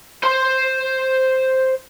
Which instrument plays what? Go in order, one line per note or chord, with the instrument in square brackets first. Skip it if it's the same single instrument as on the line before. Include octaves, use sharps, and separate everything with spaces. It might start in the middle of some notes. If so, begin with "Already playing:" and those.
[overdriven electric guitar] C5 C6